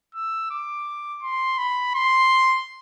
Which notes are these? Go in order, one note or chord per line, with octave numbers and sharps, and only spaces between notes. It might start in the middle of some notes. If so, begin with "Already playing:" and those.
E6
D6
C6
B5
C6